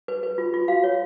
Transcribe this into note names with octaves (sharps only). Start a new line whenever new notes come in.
B4
B4
F4
F4
F#4 F5
C#5